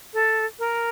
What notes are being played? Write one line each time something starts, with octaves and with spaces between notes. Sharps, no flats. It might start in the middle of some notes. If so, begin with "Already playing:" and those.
A4
A#4